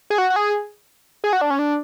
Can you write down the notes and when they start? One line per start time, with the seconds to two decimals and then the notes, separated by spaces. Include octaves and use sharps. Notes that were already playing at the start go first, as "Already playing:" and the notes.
0.10 G#4
0.18 F#4
0.30 F#4
0.36 G#4
1.24 G#4
1.33 F#4
1.41 D4
1.50 C#4
1.59 D4